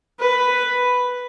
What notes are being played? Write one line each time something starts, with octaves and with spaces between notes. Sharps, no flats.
B4